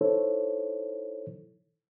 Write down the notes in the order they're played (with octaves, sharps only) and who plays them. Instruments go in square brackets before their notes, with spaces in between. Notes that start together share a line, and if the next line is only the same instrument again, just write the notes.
[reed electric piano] D#4 E4 A4 C5 C#5